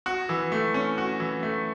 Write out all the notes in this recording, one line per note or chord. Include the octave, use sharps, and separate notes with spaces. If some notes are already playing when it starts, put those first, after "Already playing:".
F#4
E3
A3
C#4
F#4
E3
A3